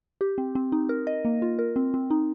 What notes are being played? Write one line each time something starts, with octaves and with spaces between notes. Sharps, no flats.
G4
C4
C4
D#4
A#4
D#5
A#3
F4
A#4
C4
C4
D#4